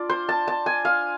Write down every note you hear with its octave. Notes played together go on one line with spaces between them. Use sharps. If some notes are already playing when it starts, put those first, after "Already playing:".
Already playing: D4 F4 D5
C5
A5
A5
G#5
F5